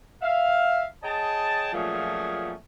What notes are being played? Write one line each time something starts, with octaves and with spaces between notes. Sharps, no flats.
E5 F5
G#4 C#5 D#5 G5 A5
A#2 F3 F#3 A3 C#4 G#4